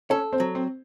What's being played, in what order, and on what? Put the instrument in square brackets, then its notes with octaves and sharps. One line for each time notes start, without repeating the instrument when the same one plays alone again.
[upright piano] C#4 C#5 [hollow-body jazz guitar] A4
[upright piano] C4 C5
[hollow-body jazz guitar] F#3
[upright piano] C4 C5